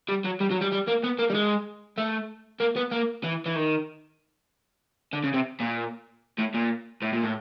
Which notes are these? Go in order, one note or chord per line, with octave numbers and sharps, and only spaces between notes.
G3
F#3
G3
F#3
G3
G3
A#3
B3
A#3
G3
G#3
A3
A#3
B3
A#3
E3
E3
D#3
D3
C#3
C3
A#2
A2
A#2
A2
A#2
A2